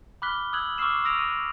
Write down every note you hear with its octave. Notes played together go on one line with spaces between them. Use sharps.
B5 D6 F6 F#6 B6 G7
D#6 E6 F#6 G#6 F#7
C#6 D6 E6 F6 C7 E7
D#6 E6 A#6 D7 F7
C#6 D#7